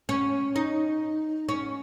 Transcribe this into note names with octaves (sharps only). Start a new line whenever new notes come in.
C#4
D#4
C#4